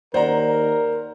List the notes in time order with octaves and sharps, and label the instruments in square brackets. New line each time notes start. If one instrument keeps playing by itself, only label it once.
[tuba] D#2 [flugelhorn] A#4 [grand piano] C5 F#5 A#5 [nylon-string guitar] D5